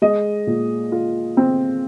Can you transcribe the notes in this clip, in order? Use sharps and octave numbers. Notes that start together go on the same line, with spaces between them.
G#3 D#5
A#2
F4
C4